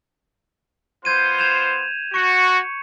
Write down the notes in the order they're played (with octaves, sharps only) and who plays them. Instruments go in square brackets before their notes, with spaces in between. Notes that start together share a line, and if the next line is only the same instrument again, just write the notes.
[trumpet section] B3 F4 C5 [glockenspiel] G6 G#6 D#7
[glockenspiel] G#6 E7 F7
[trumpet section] F#4 [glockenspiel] C#6 C#7